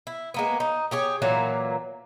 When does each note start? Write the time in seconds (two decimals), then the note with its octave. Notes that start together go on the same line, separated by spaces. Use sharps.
0.07 E4
0.34 G#3 A#3 B3
0.60 D#4
0.91 G4 G#4 C#5
1.22 A#2 E3 F#3 A#3